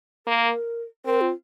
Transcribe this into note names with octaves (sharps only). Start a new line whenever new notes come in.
A#3 A#4
C4 A#4
F4